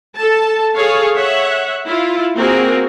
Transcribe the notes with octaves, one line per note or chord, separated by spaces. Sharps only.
A4 A5
G#4 A4 C#5 F5
C#5 E5 F#5
E4 F4
A#3 C4 F#4 G#4 A#4